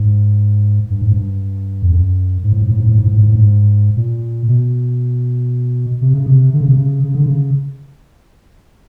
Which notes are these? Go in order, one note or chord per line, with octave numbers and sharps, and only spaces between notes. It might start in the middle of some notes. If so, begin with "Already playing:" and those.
Already playing: G#2
G2
G#2
G2
F2
F#2
G#2
A2
G#2
A2
G#2
A2
G#2
A2
G#2
A2
G#2
A#2
B2
C3
C#3
C3
D3
C#3
C3
C#3
C#3
D3
C#3